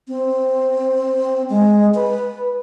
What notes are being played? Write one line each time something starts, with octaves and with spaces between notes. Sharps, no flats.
C4
G#3
B4